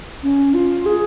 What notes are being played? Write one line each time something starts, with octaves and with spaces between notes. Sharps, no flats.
C#4
F4
G#4